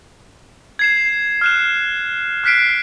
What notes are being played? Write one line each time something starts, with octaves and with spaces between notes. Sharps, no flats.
G#6 C7 E7
F6 F#6 E7
F6 F#6 B6 C7 D7